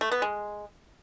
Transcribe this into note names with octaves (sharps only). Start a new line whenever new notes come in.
A3
B3
G#3